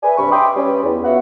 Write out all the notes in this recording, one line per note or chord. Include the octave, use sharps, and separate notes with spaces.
B4 D5 E5 G#5
G2 C3 D5 B5 C#6
E5 G5 B5 C6 D6 D#6
G3 C#4 B4
E2
B3 F4 F#4 E5 F#5